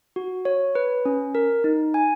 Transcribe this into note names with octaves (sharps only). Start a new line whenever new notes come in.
F#4
C#5
B4
C#4
A#4
D#4
G#5